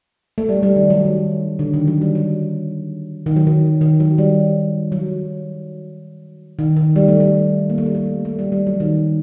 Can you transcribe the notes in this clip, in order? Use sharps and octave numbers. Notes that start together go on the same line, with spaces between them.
A3
G3
G3
D#3
F#3
D#3
D3
D#3
F#3
G3
F#3
D#3
F#3
D#3
D#3
F#3
G3
F#3
D#3
D#3
G3
A3
G3
A#3
A3
G3
A3
A3
G3
G3
F#3
D#3